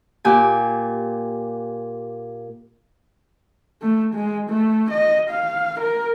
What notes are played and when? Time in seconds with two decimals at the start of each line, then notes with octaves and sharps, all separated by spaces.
0.25 A#2 G4 G#5
3.81 A3
4.14 G#3
4.50 A3
4.90 D#5
5.30 F5
5.80 A#4